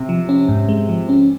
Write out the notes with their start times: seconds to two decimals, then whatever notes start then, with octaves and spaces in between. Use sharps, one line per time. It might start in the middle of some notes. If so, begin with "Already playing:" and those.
Already playing: C3
0.09 F3
0.29 C#4
0.49 G#2
0.69 G#3
0.89 F3
1.09 C#4